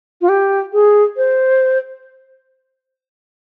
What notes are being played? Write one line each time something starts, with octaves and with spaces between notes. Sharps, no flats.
F4
G4
G#4
C5